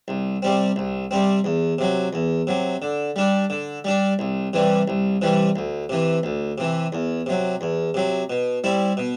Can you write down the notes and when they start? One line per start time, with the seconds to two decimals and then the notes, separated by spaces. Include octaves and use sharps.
0.08 C2
0.42 C3 G3 C4
0.76 C2
1.11 C3 G3 C4
1.44 E2
1.78 C3 F#3
2.13 E2
2.47 C3 F#3
2.82 D3
3.16 G3 D4
3.50 D3
3.85 G3 D4
4.19 C2
4.53 C3 E3 G3
4.88 C2
5.22 C3 E3 G3
5.56 D2
5.89 C3 E3
6.23 D2
6.58 C3 E3
6.93 E2
7.26 C3 F#3
7.61 E2
7.94 C3 F#3
8.30 B2
8.64 G3 C4 E4
8.97 B2